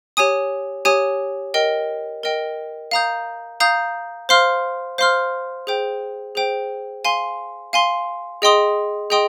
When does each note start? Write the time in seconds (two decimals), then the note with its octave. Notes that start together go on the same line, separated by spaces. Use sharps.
0.17 G4 C#5 G#5 D#6
0.85 G4 C#5 G#5 D#6
1.54 A#4 D#5 G5
2.23 A#4 D#5 G5
2.91 F5 A#5 D#6 G6
3.60 F5 A#5 D#6 G6
4.29 C5 F5 C6 F6
4.98 C5 F5 C6 F6
5.67 G#4 C5 G5
6.35 G#4 C5 G5
7.04 F5 G#5 C6
7.73 F5 G#5 C6
8.42 G#4 D#5 G5 C6 D#6
9.10 G#4 D#5 G5 C6 D#6